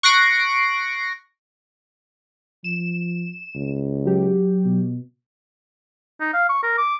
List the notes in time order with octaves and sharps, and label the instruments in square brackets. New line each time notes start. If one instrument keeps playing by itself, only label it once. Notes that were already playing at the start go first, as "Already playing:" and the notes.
[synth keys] C#6 F#6 A#6 C7 D7
[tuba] F3 [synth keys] E7
[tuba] C#2
[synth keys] F#3 G4
[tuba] B2
[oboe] D#4
F5
C#6
A#4
D6